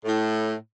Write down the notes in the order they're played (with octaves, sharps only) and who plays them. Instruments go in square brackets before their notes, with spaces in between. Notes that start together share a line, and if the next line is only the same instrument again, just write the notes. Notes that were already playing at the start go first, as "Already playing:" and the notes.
[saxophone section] A2